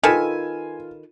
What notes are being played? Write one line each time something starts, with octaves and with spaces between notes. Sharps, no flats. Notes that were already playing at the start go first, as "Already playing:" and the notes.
D#3 F4 A4 B4 G#5 E7